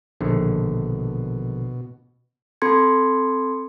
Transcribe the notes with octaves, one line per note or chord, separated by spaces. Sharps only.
A#1 B2 D3 D#3
C4 A4 B5 C6 G#6 C#7